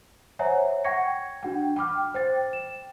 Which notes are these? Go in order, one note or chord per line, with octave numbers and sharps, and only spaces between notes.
C5 C#5 E5 F#5 G#5 A#5
F#5 G5 C#6 G#6 A#6 C#7
D4 F#4 F#5 G5
G5 B5 D6 F6
C5 G5 A6
E7